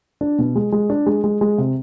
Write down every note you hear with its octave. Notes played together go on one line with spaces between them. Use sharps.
D4
B2
G#3
G#3
D4
G#3
G#3
G#3
C3